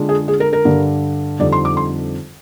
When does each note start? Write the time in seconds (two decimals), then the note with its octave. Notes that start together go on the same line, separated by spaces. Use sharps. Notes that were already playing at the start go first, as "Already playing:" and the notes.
Already playing: D3 G#3 D4 F4
0.09 G#4
0.28 G#4
0.40 A#4
0.53 A#4
0.65 G2 D3 G3
1.39 F2 D3 G3 C4 D#4 D5
1.52 C6
1.65 D6
1.77 C6